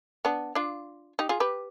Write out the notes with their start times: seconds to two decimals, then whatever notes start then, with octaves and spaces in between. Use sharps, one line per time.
0.25 B3 D4
0.55 D4 F4
1.19 D#4 G4
1.29 F4 G#4
1.40 G4 B4